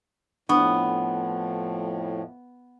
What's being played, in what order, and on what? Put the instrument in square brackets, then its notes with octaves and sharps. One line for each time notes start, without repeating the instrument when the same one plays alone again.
[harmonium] F2 A2 [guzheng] B3 [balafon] D4